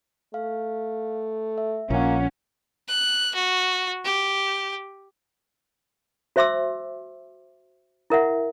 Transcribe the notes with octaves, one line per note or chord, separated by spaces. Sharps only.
A3 F5
E5
A#1 A#3 C#4 F4 F#5
F#6
F#4
G4
F#4 C5 E5 C6 D6 E6
E4 A#4 E5 F#5